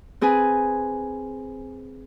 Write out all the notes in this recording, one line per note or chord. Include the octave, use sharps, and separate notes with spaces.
C4 G#4 B4 G#5